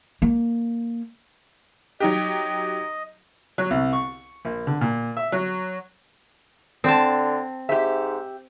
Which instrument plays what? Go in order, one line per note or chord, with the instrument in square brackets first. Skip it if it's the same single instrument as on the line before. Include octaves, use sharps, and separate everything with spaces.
[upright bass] A#3
[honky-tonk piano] F#3 D#4 G4 [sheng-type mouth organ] D#5
[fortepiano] F#3
C2
C#6
A#1
D3
A#2
E5
F#3
[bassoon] D3 [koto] C4 A5
[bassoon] G#2 [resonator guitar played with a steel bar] G4 E5